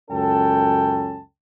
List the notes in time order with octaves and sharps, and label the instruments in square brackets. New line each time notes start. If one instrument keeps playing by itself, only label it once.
[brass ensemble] C#2 F#2 C#4 A4 G5 A5